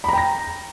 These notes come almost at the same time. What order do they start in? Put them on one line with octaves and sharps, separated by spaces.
B5 A#5 G5 A#6